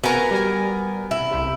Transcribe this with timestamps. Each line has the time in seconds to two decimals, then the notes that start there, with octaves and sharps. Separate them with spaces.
0.04 B3 F#4 A#4 G#5 A#5
0.31 G3 G#5
1.11 E4
1.31 C2 C3